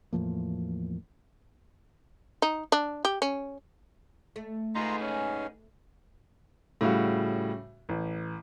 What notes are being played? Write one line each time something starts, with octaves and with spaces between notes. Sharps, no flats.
E2 A2 F3 A#3
D#4
D4
G4
C#4
A3
D#4 F4 G#4 B4 A#5 C6
C#4
A2 C#3 G3 F#4 F5
A1